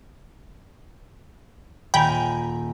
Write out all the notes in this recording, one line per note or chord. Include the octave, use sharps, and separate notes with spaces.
D#1 G5 G#5 A#5 B5